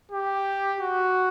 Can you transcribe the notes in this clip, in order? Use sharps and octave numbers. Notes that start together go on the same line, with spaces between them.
G4
F#4